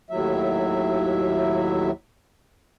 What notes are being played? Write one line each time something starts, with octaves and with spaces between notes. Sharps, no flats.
D#2 A2 F#3 E5